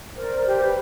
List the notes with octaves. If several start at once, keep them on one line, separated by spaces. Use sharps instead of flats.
A#4 C5 D5
G4 C5
B4